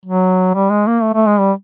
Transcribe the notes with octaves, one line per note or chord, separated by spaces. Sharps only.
F#3
G3
G#3
A#3
A3
A3
G#3
G3